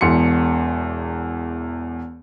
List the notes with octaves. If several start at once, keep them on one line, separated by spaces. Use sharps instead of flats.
E1 E2 C6 C#7